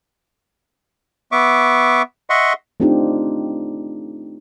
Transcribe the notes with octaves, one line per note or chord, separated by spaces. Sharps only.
B3 E5 C#6 D6
D#5 E5 F#5 C6 C#6
A3 C4 D4 D#4 F4 G4